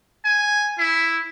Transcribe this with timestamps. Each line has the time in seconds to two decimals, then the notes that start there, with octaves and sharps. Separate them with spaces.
0.25 G#5
0.78 E4